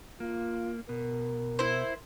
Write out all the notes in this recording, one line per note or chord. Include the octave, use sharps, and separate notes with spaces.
A#3 F4
B2 A#4
E4 C5